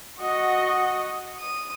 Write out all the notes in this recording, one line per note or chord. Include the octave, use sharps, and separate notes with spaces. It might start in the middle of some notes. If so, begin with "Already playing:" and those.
F#4 D#5 F#5 C#6
D#6